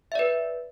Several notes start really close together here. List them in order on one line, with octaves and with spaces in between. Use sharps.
E5 D5 B4